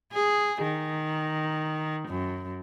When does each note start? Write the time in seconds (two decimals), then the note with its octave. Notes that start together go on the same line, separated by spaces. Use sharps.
0.13 G#4
0.63 D#3
2.08 F#2